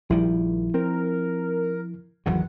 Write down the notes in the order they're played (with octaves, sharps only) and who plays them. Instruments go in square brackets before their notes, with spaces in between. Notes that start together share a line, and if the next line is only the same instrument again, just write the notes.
[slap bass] A#1 D#3 G3 [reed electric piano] F3 E4
[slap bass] C4 [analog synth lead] A#4
[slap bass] G#1 E2 C#3 [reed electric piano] E3 F#3 [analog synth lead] F#5